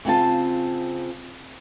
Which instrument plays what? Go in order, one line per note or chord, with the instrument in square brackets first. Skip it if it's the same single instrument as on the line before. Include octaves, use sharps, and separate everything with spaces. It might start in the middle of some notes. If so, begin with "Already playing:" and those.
[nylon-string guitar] C#3 C4 F4 A5